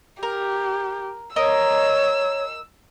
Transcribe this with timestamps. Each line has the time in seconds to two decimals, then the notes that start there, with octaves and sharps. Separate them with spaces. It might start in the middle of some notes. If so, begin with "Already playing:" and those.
0.23 G4 A#4
1.36 A#4 C#5 D#5 E6